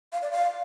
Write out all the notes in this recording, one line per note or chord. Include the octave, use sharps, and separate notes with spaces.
F5
D5
F5